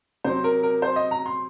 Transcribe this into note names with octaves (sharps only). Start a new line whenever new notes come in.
C3 F#3 C5
A#4
A#4
C5
D#5
A#5
C6